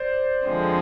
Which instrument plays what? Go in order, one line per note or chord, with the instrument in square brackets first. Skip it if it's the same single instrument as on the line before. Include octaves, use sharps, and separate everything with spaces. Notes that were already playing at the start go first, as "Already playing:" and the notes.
Already playing: [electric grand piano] C5 D5
[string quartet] F2 D3 F3 G#3 C4